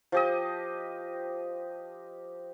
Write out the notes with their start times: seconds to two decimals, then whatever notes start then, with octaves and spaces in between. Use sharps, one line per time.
0.12 F3 G4 D#5